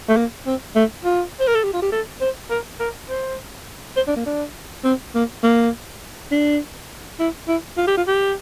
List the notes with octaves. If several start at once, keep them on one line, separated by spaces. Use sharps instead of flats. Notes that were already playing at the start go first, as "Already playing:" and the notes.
A3
A#3
C4
A3
F4
C5
A#4
A4
G4
F4
G4
A4
C5
A#4
A#4
C5
C5
D4
A#3
D4
C4
A#3
A#3
D4
E4
E4
F4
G4
F4
G4